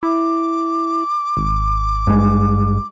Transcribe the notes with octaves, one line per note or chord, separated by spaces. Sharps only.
E4 D6
G#1
G2 G#3